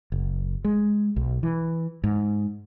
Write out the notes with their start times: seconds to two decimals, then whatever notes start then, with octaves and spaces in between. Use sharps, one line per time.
0.12 F#1
0.64 G#3
1.16 B1
1.43 E3
2.04 G#2